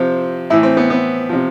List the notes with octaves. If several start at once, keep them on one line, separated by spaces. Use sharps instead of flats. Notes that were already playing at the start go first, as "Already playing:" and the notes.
Already playing: C3 F3 C4
A2 E3 E4
C4
B3
B3
C3 F3